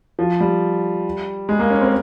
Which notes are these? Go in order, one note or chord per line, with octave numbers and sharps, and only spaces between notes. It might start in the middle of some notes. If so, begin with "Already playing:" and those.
F3
G3
G#3
A#3
C#4
C4